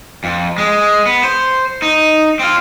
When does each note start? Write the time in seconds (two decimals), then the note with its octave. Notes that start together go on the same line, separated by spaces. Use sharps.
0.24 F2
0.58 G#3
1.06 B3
1.24 C5
1.82 D#4
2.39 C4 F4